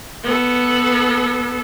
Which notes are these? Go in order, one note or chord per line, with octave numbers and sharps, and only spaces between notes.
B3 A4